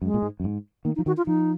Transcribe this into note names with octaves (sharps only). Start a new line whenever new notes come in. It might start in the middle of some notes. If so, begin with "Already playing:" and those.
F#2 G#3
A#2
G#2
F#2
G#2
D#3 A#3
D#4
F3
D#3 F#4
F4
F3 D#4